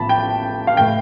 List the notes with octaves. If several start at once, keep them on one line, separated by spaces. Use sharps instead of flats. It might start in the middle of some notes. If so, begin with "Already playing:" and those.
Already playing: A1 A2 F3 B3 A5 B5
G5
F5
A2 E3 G5